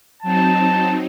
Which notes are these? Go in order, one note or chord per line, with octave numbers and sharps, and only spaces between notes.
F#3 C4 D#4 A5